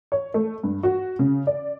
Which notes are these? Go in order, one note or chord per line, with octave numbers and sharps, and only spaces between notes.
C#5
A3
G2
F#4
C#3
D5